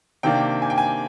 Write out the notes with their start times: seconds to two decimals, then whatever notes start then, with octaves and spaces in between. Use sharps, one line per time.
0.23 C3 D#3 A#3 D4 G5
0.62 G#5
0.70 G5
0.78 G#5